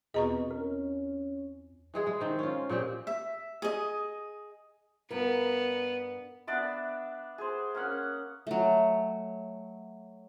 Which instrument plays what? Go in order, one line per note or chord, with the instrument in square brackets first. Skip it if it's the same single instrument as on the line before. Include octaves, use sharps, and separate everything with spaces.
[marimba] E2 C4 F4 [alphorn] B2 [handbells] G#4 [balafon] D#5 A#5 C#6
[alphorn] C#4 [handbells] A#4
[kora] E3 G#3 G#4
G#3
D#3 C4
C#4 F4
A#2 C4 G4 G#4
[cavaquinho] E5
G#4 D#5
[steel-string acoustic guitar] G2 A#4 [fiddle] B3
[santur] B3 D4 D5 E5
G#4 C5
A#3 C#4 F#5
[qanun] F#3 A3